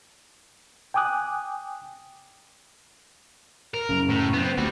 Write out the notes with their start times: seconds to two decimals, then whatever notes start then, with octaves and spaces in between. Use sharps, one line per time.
0.94 G5 G#5 D6 D#6 F#6
3.74 A#4
3.89 F#2 C#3
4.10 A2
4.33 B3 C4
4.58 D2 G3 F#4